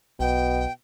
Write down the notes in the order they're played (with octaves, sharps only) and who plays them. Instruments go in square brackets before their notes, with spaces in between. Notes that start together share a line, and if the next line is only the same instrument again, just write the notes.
[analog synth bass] B1 [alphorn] B2 [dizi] G5